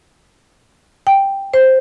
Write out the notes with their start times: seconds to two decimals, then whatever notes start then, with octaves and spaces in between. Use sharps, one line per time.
1.07 G5
1.54 C5